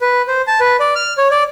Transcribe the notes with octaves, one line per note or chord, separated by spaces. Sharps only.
B4
C5
A5
B4
D5
F6
C#5
D5